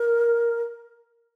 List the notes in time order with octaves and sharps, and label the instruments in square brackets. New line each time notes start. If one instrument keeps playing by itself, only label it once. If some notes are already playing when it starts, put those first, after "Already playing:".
Already playing: [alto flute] A#4